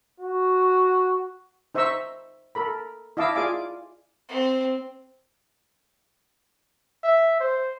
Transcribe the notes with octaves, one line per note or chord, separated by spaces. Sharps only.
F#4
D#4 C5 E5 A#5 C#6 E6
A4 A#4 B5
E4 D#5 F5 A5 D6 E6
F4 G#4 D5 F5 G#5 D6
C4
E5
C5